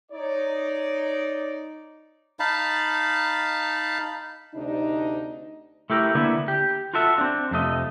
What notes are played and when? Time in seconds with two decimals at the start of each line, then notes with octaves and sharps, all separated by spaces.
0.12 D#4 C#5 D5
2.40 D#4 F5 A5 B5
4.54 D2 C3 D4 D#4
5.90 A3 E4 G4 A#4
6.15 D3 A#3 B3 E4
6.48 G4
6.94 F4 F#4 A4 E5
7.18 C4 D4
7.51 F2 C3 A3 D#5